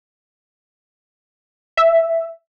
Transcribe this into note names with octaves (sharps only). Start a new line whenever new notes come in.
E5